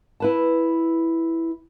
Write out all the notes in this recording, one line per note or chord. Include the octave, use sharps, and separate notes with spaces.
E4 B4 A5